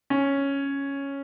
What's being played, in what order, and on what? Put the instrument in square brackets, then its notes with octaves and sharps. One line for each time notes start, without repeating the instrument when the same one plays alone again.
[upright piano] C#4